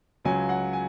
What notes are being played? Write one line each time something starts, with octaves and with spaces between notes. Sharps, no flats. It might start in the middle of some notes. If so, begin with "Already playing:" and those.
C#2 C#3 F#3 G#5
F#5
G#5